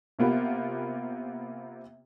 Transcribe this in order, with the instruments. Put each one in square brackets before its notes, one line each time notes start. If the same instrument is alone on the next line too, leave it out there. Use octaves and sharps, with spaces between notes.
[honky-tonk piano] C3 A#3 B3 F4 G4